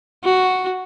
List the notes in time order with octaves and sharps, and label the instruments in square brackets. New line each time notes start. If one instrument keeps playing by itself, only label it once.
[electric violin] F#4